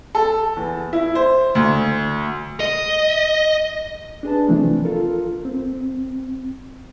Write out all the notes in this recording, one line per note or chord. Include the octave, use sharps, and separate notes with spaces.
A4
E2
E4
C5
D2
D#5
D4 G#4 B4 A5
C3 E3 F3 A3 C4 D4
F4 A4 A#4
C4